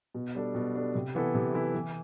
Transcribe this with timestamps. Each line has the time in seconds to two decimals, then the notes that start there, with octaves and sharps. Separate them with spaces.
0.14 B2
0.35 G3 D4 A4
0.55 B2
0.75 G3 D4 A4
0.95 C3
1.15 E3 B3 E4 A4
1.35 C3
1.54 E3 B3 E4 A4
1.75 E3